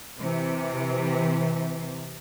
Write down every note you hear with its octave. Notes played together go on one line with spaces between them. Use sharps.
C3 E3